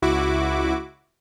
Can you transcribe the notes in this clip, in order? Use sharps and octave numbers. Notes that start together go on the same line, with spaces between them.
C#2 E4 F#4 D6